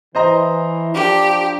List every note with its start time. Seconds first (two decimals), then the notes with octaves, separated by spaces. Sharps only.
0.15 E3 C5 D#5 A#5
0.95 F3 D4 G4